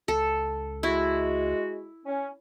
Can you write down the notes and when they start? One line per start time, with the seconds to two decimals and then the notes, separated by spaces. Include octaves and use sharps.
0.08 C#2 A4
0.83 G#3 E4 F#4
2.06 C#4